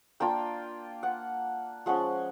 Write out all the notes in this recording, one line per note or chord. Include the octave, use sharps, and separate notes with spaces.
A#3 D4 F4 G5
F#5
F3 G#3 C#4 F#5